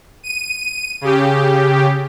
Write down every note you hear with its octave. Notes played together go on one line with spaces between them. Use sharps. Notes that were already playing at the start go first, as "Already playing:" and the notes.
D#7
C#3 G4